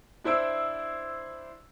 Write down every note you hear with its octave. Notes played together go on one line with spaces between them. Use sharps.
D4 E4 C5 E6 D7